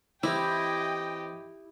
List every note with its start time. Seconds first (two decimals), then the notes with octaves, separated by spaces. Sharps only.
0.23 E3 C4 E4 G4 D#5 G5 D6